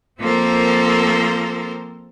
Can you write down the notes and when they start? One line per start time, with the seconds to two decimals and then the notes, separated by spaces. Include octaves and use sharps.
0.21 F3 A#3 C4 A4 A#4 C5